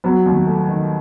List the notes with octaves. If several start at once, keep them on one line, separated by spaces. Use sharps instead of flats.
F#3 B3
D#2
A3
D#3